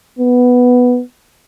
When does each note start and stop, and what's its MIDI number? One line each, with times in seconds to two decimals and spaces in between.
0.19 1.01 59